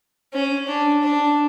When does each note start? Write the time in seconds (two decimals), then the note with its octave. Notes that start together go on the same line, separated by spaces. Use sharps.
0.33 C#4
0.67 D4
1.02 D4